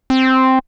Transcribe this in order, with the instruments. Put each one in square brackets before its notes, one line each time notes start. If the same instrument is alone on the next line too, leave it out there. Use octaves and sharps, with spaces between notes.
[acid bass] C4